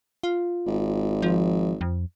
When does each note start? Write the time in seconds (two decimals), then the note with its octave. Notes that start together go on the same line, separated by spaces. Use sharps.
0.23 F4
0.67 G#1
1.22 F3
1.81 F2